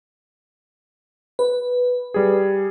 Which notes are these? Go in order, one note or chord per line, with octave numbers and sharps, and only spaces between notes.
B4
G3 G#4